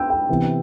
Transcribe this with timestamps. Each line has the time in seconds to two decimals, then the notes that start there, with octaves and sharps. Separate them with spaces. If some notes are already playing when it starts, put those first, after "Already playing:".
Already playing: G5 E6
0.10 G5
0.29 C3 E3 B3